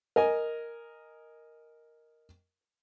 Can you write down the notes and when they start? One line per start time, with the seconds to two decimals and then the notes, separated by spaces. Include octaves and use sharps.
0.16 A#4 D#5 G#5